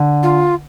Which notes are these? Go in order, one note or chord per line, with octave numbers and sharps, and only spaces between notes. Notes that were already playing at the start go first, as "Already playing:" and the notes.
Already playing: D3
F4